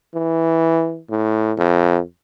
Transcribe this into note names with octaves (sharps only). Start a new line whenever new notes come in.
E3
A2
F2